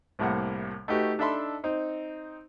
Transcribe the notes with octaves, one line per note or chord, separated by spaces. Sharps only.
C2 A2 C3 A#3 F#5
A3 D#4 F#4 G4 B4
D4 D#4 A4 E5 B5 C6
C4 D#4